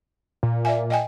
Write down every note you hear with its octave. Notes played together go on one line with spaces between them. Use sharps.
A#2
D5 E5 G#5
D#5 G5 G#5